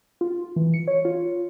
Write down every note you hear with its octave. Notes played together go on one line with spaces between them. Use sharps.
F4
E3
C#7
C#5
F4